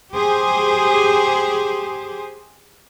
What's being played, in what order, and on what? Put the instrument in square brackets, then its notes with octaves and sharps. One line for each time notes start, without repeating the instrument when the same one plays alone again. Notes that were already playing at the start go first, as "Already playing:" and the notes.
[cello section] G4 G#4 C5